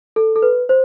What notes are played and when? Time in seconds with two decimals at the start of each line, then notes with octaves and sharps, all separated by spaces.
0.16 A4
0.36 A4
0.42 B4
0.69 C5